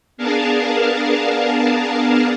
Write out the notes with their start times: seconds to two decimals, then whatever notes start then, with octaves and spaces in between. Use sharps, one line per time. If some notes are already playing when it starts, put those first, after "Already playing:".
0.17 B3 D4 G#4 A#4 F5 A5